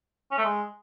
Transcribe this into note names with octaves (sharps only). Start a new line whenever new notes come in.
C#4
A3
G#3